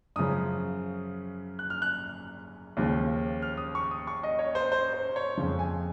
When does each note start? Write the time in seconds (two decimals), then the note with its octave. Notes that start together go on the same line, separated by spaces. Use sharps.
0.16 F#2 C#3 F3 D#6
1.59 F#6
1.70 F6
1.82 F#6
2.77 D#2 C#3 F3
3.42 F6
3.57 D#6
3.75 C#6
3.91 D#6
4.07 C#6
4.23 D#5
4.39 C#5
4.55 C5
4.72 C5
4.93 C5
5.16 C#5
5.37 F2 C#3 F3
5.59 G#5